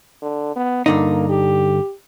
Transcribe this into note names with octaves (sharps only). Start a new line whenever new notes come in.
D3
B3
G2 D3 A#3 D#4
G4